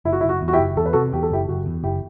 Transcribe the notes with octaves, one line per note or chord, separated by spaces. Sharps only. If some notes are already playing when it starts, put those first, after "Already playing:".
F#1 E4
F#4
E4
F#1
F#4
E2
F#4
E4 G4
F#1
E2 A4
B4
C3 F#4 A4
E2 G4
A4
F#1 E4 G4
F#1 F#4
E2
F#1 E4 G4